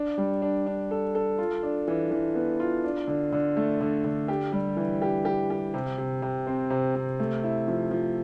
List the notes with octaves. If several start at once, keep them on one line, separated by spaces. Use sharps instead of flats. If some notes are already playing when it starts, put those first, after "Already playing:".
Already playing: D4
G3
D4
D4
A4
A4
F4
D4
E3
E3
B3
F4
D4
D3
D3
A3
D3
D3
G4
G3
E3
G4
G4
G4
C3
C3
C3
C4
C3
C3
A3
E4
F3
F3